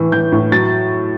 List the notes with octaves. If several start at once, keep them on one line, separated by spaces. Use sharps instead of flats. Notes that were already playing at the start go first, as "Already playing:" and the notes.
Already playing: A2 E3
E3 G6
A2
F#3 A6